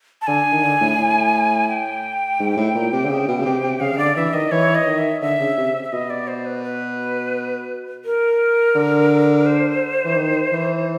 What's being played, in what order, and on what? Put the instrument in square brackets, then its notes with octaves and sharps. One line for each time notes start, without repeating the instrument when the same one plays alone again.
[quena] A5
[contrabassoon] D3 [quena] G#5
[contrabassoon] D#3
D3
A2
A2
[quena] G5
[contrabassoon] G#2
A2
A#2
C3
D3
C#3
B2
C#3
C3
C3
[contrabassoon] C#3 [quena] F5
[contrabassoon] C#3
[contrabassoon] D3 [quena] D5
[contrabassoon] E3 [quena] E5
[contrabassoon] D#3 [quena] D#5
[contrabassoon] E3 [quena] C#5
[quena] D#5
[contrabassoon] D#3
[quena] E5
[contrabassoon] D3 [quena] E5
[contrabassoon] C#3
C3
[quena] E5
[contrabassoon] B2 [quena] D#5
[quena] D5
C5
B4
B4
A#4
[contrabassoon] D3
[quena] C5
[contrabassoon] E3
D#3
E3